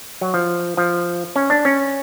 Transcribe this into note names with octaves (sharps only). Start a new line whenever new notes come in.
F#3
F3
F3
C#4
D4
C#4